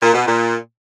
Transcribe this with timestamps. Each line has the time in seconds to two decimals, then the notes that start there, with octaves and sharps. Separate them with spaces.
0.02 A#2
0.14 B2
0.26 A#2